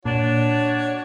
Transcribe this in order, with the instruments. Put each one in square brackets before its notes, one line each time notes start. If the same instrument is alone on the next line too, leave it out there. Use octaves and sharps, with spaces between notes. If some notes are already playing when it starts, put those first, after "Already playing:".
[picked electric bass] A#2 [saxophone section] D4 [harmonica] F#4 C#5